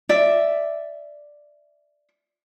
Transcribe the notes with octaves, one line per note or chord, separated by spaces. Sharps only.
D5 E5